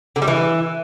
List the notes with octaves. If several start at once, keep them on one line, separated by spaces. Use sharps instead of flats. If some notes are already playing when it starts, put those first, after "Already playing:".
D3
G3
E3